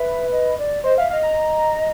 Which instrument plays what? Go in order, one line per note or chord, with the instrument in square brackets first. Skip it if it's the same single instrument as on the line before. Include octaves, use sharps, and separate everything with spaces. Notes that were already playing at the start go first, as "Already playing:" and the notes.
Already playing: [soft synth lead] B4 [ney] E5
[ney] D#5
D5
[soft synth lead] C5 [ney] D#5
[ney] E5 [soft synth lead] F5
[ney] D#5 [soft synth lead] F5
[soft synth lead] A#5